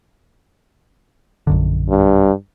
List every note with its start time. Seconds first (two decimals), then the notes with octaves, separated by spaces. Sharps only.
1.47 A#1 F#2 D3
1.90 G2